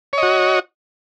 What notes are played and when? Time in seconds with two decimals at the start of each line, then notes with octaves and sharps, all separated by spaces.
0.13 C#5
0.18 D#5
0.23 F#4